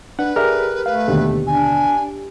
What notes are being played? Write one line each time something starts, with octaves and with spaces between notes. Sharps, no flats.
D4 B4 F#5
G4 G#4 A#4 D5 E5 F6
A3 B4 F5
D#2 B2 D3 G4
D4 G#5